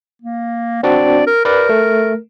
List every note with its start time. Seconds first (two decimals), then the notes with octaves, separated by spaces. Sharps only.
0.22 A#3
0.83 C4 D4 F#4 D5
1.27 A#4
1.45 A#4 B4 D5
1.69 A3